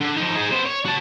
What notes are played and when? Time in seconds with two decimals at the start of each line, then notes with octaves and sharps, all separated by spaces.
0.01 D3
0.17 F3 D#4
0.35 D#4 G#4
0.51 B3 C5
0.66 C#5
0.86 F#4 A5